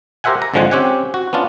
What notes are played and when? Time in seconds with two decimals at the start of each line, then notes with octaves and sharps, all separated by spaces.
0.24 G4 A#4 C5 E5 F#5 G#5
0.42 A#5
0.54 G#1 D3 F3 G#3 F#5 G#5
0.71 C4 C#4 G4 F#5 G#5
1.14 F#4
1.33 B3 C#4 D4 F4